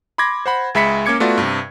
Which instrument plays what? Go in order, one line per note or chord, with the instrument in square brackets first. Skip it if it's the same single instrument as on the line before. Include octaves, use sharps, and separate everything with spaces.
[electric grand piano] B5 C6 D6 G#6 A#6
C5 F#5 B5
C#2 G#3 E5 B5 B6 C#7
A#3 C#4 D6 G#6 C#7
A3 B3 F4 F#4 D5
G2 C3